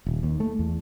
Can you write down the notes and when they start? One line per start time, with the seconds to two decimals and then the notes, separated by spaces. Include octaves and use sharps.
0.06 D#1
0.23 D#2
0.40 A3
0.59 E2